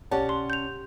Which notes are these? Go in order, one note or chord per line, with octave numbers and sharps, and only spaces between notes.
B1 C#4 G4 D5 F#5 A5
C6
G6 F7